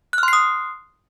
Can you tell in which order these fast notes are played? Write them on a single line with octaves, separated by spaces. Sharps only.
F#6 F6 C6 C7 D#6